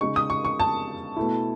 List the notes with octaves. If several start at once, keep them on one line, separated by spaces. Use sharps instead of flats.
C#3 G#3 D#4 C#6
D#6
C#6
C#6
A5
B2 A3 E4